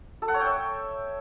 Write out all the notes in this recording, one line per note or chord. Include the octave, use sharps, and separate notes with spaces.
A4
F#5
C#5
G5
E5